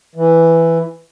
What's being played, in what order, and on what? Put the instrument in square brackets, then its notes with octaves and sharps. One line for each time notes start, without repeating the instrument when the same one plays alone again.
[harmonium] E3